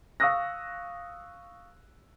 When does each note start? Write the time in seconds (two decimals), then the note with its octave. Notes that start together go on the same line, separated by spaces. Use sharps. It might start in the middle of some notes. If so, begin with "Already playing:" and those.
0.20 F5 C#6 D#6 E6 F#6 A#6